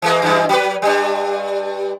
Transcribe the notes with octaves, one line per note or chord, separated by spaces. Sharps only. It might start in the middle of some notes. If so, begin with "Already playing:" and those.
E3 G#3 A#3
F#2 E3 G#3
F#3 B4
G2 G3